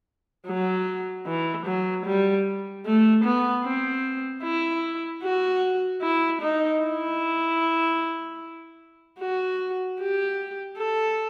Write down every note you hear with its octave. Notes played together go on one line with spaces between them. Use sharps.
F#3
E3
F#3
G3
A3
B3
C4
E4
F#4
E4
D#4
E4
F#4
G4
A4